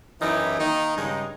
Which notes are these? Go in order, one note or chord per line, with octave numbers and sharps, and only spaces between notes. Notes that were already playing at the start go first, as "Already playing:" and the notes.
F#2 E3 D#4 E4 G4
D#3 A#3 D#4
G2 C#3 G#3 D#4